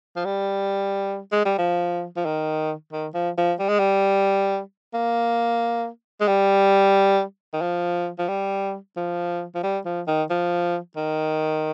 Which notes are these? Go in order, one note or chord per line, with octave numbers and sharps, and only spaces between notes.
F3
G3
G#3
G3
F3
F3
D#3
D#3
F3
F3
G3
G#3
G3
A#3
G#3
G3
D#3
F3
F3
G3
F3
F3
G3
F3
D#3
F3
D#3